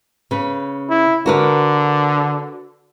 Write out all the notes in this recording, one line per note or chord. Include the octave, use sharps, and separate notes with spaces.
C#3 B4
E4
D3 F#4 A#4 B4